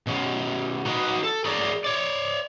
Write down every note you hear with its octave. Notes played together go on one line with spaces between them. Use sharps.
B2 C#4
D#4 F#4 B4 D5 D#5
A4
G#4 A#4 C#5 D5
C#5 D5